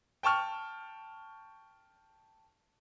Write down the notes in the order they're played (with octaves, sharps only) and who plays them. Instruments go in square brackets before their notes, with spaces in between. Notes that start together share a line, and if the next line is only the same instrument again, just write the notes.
[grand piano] G5 A5 C#6 F6